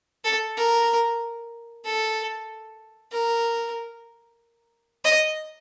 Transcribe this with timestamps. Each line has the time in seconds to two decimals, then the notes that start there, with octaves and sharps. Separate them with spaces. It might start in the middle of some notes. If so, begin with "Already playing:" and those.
0.24 A4
0.57 A#4
1.85 A4
3.13 A#4
5.05 D#5